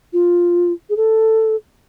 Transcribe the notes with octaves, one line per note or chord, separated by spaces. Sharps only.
F4
G#4
A4